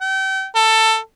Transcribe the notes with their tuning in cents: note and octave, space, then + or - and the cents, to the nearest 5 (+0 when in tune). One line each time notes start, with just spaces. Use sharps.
G5 -35
A4 +15